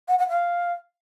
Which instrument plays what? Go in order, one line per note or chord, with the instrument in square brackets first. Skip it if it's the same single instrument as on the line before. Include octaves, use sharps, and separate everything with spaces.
[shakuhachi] F#5
F#5
F5